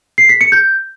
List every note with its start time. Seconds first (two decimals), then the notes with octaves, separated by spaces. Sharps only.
0.18 C7
0.29 B6
0.41 C#7
0.52 G6